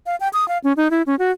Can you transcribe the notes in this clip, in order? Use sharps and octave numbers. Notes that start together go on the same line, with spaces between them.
F5
G5
D#6
F5
C#4
D#4
E4
C#4
F#4